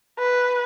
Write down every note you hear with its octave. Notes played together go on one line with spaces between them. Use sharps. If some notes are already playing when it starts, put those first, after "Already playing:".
B4